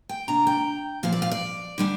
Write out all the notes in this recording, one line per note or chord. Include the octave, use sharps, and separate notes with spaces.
G5
C3 A#3 D4 A#5
G5
A#2 F3 C4 F5
D5
F5
D5
D3 G3 D4